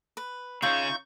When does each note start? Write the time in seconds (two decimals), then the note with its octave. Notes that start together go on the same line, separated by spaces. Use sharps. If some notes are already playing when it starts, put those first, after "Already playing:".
0.17 B4
0.62 C#3 C#4 D#4 F4 E5 C#6 G6